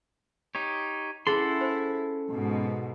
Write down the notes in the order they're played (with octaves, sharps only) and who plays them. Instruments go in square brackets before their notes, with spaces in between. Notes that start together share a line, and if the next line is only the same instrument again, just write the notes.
[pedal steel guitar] D#4 G4 C#5
[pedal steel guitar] C#4 F#5 C6 [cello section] E4 [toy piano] G#4 [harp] A4
[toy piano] C5
[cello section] G#2 B2